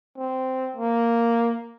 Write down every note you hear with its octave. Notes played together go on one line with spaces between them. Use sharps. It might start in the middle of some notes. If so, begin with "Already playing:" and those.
C4
A#3